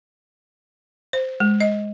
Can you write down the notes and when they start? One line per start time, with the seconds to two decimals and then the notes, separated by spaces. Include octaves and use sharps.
1.13 C5
1.40 G#3
1.60 D#5